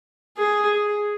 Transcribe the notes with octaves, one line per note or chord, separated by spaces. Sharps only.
G#4